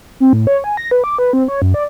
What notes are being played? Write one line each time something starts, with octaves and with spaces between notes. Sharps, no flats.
C4
A2
C#5
G#5
A#6
B4
D6
B4
C4
C#5
F#2
D5